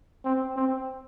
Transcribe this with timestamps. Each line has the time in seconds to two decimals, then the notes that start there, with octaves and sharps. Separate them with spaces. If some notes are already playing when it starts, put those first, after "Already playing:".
0.25 C4
0.56 C4